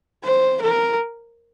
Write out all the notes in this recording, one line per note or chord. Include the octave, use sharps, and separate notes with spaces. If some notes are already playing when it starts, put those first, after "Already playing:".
C5
A#4